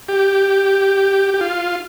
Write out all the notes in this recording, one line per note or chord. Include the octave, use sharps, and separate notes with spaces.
G4
G4
F4